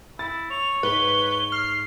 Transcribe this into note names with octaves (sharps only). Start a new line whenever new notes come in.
E4 A6
C#5 F7
G#2 B4 G7
F6 C7